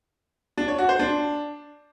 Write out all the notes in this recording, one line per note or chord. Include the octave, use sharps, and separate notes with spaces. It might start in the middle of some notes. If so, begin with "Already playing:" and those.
D4
C#5
F#4
C5
D4